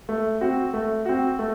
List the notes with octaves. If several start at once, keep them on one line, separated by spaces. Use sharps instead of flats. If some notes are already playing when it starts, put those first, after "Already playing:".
A3
C4 F#4
A3
C4 F#4
A3